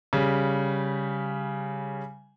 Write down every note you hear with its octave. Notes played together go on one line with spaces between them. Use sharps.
C#3 G3